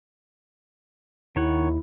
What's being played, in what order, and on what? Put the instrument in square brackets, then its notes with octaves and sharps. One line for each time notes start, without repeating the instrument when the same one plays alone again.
[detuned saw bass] D#2 [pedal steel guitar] D#3 C#5 F#5 [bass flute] E4